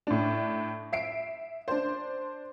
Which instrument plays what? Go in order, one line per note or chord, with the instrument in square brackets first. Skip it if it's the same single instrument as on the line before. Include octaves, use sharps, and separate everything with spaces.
[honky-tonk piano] A2 D4
E5 C7 D7
D4 C5